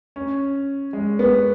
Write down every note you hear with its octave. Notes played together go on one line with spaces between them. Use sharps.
C#4
G#3
B3